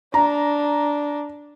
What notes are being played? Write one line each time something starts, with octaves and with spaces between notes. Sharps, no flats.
D4 A#5